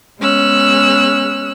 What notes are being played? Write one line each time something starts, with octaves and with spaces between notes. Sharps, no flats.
G#3 B3 C#4 E6 F#6